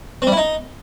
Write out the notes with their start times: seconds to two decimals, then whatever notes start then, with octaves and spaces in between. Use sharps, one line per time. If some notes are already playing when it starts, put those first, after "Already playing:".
0.22 C4
0.27 G3
0.32 E4
0.37 D#4